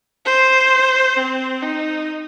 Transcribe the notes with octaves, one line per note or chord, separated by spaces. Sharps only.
C5
C4
D#4